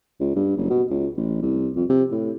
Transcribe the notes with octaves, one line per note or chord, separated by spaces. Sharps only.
C#2
G2
F#1
B2
C#2
A1
C2
F2
C3
A2